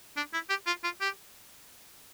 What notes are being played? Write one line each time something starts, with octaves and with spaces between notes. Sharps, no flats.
D4
E4
G4
F4
F4
G4